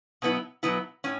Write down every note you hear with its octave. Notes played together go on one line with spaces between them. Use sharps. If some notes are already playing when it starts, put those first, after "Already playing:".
B2 F#3 B3 E4
B2 F#3 B3 E4
A2 C#4